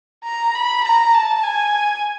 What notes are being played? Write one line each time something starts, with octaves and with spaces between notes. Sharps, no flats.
A#5
B5
A#5
A5
G#5